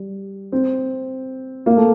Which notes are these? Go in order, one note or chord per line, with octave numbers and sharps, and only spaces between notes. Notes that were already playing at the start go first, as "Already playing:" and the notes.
Already playing: G3
C4
A#3
A3